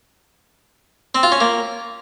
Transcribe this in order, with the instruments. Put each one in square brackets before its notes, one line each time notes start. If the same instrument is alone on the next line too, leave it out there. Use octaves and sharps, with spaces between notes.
[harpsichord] C4
F4
C#4
A#3